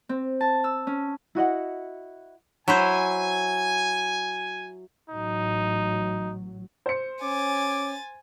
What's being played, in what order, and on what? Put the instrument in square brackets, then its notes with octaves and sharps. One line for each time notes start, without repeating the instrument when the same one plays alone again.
[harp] C4
A5
E6
C#4
[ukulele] E4 F#4 D#5 F#5
[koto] F#3 E4 C5 [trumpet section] G#5
[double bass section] A1 F#3 [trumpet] D#4
[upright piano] C5 C#7
[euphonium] C#4 [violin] G#5 A6 [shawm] D6